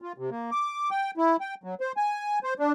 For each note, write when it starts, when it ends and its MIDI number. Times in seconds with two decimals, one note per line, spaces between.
0.02 0.13 65
0.18 0.30 48
0.31 0.51 58
0.51 0.90 86
0.91 1.11 79
1.17 1.37 64
1.41 1.55 79
1.64 1.75 54
1.81 1.92 72
1.97 2.39 80
2.44 2.54 72
2.59 2.72 62